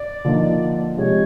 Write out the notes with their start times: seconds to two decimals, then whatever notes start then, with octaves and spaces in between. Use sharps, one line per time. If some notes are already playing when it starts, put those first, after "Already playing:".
Already playing: D5
0.25 D3 F3 A#3 D#4
0.97 C3 F3 G#3 C#5